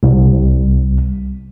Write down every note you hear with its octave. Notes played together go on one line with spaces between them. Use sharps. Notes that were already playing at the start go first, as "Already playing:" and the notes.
C2